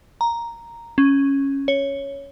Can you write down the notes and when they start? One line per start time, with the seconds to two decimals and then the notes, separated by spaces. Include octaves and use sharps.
0.21 A#5
0.98 C#4
1.68 C#5